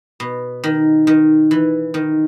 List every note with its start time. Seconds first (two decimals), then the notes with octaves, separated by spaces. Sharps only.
0.20 B2
0.64 D#3
1.07 D#3
1.51 E3
1.94 D#3